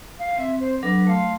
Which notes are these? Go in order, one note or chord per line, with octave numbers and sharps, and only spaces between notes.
F5
C4 E5
C5
F#3 D4 A4 B4
A3 F5 C6